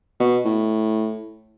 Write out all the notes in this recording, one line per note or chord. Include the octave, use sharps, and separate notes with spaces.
B2
A2